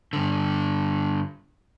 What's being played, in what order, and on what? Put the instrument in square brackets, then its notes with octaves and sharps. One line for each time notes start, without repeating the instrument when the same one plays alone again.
[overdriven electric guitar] G2 D3